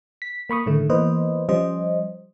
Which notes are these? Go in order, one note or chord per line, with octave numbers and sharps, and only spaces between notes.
B6
A#3 B5 C#6 D#6
A2 D3 D#3 A3
E3 A#3 B3 B4 C5 D#5
F3 G3 C#4 C5 D#5